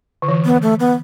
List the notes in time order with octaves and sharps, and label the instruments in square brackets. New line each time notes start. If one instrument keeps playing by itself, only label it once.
[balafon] D3
E3
[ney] B3
A3
B3